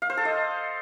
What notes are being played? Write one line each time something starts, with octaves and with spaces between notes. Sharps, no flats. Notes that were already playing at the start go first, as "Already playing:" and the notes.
F5
C5
A4
D#5